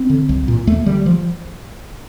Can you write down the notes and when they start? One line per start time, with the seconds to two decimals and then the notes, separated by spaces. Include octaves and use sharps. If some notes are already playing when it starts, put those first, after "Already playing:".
Already playing: C4
0.10 D3
0.29 C2
0.48 A#2
0.67 D#2 A3
0.86 D3 G3
1.06 F3